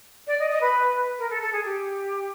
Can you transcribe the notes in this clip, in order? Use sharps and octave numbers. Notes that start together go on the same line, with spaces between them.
D5
D#5
D#5
B4
A#4
A4
A4
G#4
G4